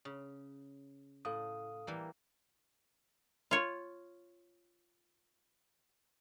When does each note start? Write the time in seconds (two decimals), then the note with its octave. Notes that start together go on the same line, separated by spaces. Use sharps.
0.05 C#3
1.25 A2 A4 F5 D#6
1.87 E3 G3 A#3
3.51 F4 C#5